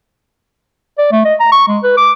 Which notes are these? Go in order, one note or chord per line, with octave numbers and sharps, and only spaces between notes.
D5
A3
D#5
A#5
C#6
G#3
B4
D6